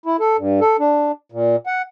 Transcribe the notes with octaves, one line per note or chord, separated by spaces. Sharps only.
E4
A4
G2
A4
D4
A#2
F#5